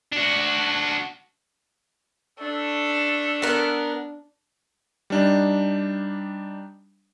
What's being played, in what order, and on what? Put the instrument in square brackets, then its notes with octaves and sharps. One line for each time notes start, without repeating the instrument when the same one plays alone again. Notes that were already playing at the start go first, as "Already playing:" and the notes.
[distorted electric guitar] D4 F#4
[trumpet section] A3 A4 [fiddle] D4
[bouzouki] B3 A#4
[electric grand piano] G3 D4 D#4